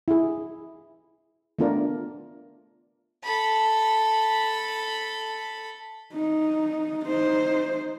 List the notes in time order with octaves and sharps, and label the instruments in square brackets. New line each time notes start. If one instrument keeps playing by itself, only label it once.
[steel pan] E4 G#4
A3 B3 D4 F4 A#4 D5
[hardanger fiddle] A4 B5
[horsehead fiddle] D#4
D#4 C5